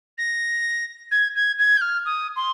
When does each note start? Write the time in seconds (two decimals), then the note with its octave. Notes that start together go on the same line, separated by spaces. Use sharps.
0.18 A#6
1.11 G#6
1.35 G#6
1.59 G#6
1.77 G6
1.81 F6
2.05 D#6
2.36 C6